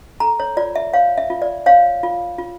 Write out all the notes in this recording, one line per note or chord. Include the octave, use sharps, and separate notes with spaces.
A4 A#5
C#5
F4 D5
E5
C#5 F5
E5
F4
D5
C#5 F5
F4
F4